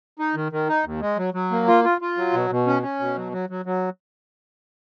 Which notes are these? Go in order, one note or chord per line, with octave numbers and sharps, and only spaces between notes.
D#4
D#3
D#3
D#4
D#2
G#3
F#3
F#3
A#3
F4
F4
F4
F#3
B2
B2
C#4
C#4
B2
F#3
F#3
F#3
F#3